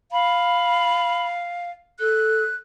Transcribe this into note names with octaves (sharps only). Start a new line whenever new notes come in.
F5 B5
A4 F#6